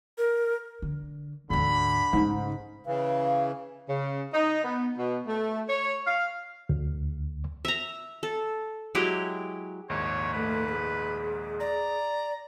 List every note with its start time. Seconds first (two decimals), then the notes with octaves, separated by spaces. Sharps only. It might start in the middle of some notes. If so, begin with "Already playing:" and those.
0.18 A#4
0.82 D3
1.50 D2 G#2 D3 B5
2.13 G#2 C#3
2.86 C#3 E3 F5
3.89 C#3
4.33 D#4
4.64 B3
4.98 B2
5.27 A3
5.69 C#5
6.07 F5
6.69 D2
7.65 E5 A#5
8.23 A4
8.95 F#3 G#3 E4 G4
9.89 A#1 D#2 G#2 C#5
10.33 A3 B4
10.69 G#4
11.60 D5 A#5